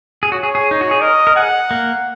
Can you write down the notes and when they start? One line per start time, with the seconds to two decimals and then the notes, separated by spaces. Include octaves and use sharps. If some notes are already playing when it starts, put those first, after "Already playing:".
0.23 G#4
0.32 F#4 C#5
0.43 G#4
0.55 G#4
0.71 D#4
0.81 F#4
0.91 G#4
1.01 A#4 D#5
1.27 A#4
1.36 G#4 F#5
1.71 A#3